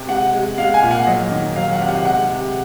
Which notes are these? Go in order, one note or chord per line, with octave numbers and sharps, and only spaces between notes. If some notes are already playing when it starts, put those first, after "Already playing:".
Already playing: C3
G#3 F#5
G#3
G#3 F5
G#5
A#2
F#5
F#3 D#5
D#3
F#3 F5
F#5
C3
F#5
G#3 F#5
C3